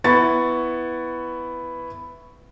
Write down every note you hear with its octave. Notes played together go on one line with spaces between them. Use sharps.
B3 E4 C#6 A6